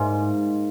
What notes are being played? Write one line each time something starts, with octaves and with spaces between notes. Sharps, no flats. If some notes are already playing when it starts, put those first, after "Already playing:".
Already playing: G#2 A#3